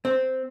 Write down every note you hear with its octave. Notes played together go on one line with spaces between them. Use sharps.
C4